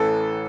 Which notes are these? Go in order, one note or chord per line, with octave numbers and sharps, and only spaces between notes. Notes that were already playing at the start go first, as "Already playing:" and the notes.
Already playing: A1 A2 E3 A4